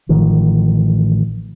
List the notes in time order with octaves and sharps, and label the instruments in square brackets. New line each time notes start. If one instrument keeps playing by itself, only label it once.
[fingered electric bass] A1 D#3 F3